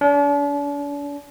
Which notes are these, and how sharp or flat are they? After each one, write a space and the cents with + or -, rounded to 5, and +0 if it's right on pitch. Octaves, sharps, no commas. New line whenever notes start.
D4 -40